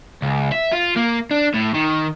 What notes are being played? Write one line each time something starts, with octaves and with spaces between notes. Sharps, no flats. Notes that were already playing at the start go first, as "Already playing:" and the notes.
C#2
E5
F4
A#3
D4
A2
D#3